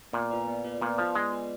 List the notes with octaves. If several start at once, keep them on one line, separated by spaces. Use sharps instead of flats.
A#2 B3
F4 B4 D5
B3
F4 B4 D5
A#2 B3
F3 F4 B4 D5
G#3 B3
F4 B4 D5